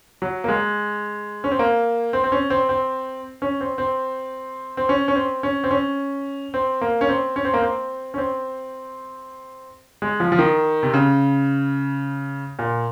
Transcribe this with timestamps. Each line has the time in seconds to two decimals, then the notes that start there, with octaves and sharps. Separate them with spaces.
0.22 F#3
0.44 A#3
0.48 G#3
1.44 C#4
1.51 C4
1.59 A#3
2.13 C4
2.24 C4
2.32 C#4
2.50 C4
2.69 C4
3.42 C#4
3.61 C4
3.78 C4
4.77 C4
4.89 C#4
5.08 C#4
5.16 C4
5.43 C#4
5.64 C4
5.71 C#4
6.54 C4
6.81 A#3
7.01 C#4
7.09 C4
7.36 C#4
7.45 C4
7.54 A#3
7.62 C4
8.14 C#4
8.18 C4
10.02 G#3
10.20 F3
10.32 F3
10.39 D#3
10.83 C3
10.94 C#3
12.59 A#2